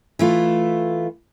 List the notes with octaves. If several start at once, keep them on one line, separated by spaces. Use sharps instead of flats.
E3 A3 F4